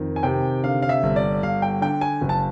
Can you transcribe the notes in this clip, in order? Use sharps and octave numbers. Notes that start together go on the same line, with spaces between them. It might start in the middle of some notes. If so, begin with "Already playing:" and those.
Already playing: F2 D#3
G#5
C3 G5
D3 F5
F5
E5
G1
D5
G1 F5
G5
D3 G5
G#5
F#1
A5